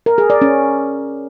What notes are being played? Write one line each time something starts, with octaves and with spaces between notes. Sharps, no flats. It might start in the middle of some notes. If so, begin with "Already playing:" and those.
A#4
G#4
D5
C#4